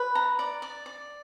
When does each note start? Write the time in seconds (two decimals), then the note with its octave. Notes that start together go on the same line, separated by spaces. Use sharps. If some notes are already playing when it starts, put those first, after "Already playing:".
Already playing: B4
0.15 A#5
0.39 D5
0.62 D5
0.86 D5